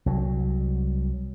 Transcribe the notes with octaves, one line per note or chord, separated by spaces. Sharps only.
C2 F#3